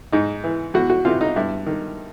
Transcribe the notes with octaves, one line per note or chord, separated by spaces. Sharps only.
G#2 D#4
E3
E2 F#4
F#4
C3 E3 F4
D#4
G2 E4
D#3